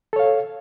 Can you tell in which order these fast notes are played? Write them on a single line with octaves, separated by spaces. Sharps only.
A4 C#5 F5